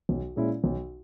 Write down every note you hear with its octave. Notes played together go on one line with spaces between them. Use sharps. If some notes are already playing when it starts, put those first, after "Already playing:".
B1
A#2 G#3 C#4 E4
B1